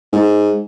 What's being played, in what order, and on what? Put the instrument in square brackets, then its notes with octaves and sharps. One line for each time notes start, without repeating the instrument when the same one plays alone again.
[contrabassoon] G#2